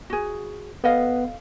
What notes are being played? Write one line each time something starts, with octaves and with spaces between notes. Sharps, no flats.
F#4 G#4
B3 A4 D#5 F5